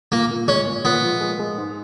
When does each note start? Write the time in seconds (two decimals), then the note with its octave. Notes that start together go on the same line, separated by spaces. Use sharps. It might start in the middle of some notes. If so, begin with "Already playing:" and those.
0.12 A#2 A#3
0.31 A#2
0.48 G#3 C#4
0.66 A#2
0.85 A#2 B3
1.03 F3
1.21 G#3
1.39 G#3
1.58 G#2